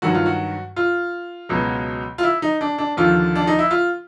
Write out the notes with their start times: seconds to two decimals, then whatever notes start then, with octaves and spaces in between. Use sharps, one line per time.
0.02 G2 D#3 F#3 F#4
0.14 F4
0.26 F#4
0.76 F4
1.49 C#2 B2 F#3
2.18 F4
2.23 E4
2.42 D#4
2.61 D4
2.78 D4
2.97 D#2 D3 F3 F4
3.35 D4
3.47 D#4
3.59 E4
3.71 F4